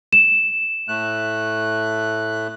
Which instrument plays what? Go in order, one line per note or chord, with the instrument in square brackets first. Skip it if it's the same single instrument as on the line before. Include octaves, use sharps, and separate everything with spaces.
[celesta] E7
[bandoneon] A2 A3 F#6